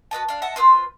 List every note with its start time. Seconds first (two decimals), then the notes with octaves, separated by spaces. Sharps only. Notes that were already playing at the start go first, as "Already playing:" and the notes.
0.11 F#4 B4 D#5 A5
0.29 D4 F5
0.42 D#5 E5 F#5 A5
0.56 F4 G#4 B4 C5